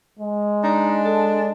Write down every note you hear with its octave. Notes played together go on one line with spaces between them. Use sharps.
G#3
D4 D#4
A4